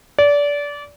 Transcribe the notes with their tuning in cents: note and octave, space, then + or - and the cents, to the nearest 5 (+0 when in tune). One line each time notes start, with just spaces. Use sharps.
D5 -25